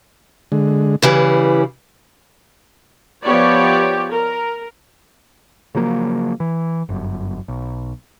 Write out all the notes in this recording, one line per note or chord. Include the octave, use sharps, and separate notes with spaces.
D3 G#3
C#3 E3 G3 B4
F3 B3 G4 C#5 D5
A#4
C#3 F3 F#3 A#3
E3
G1 F#2
B1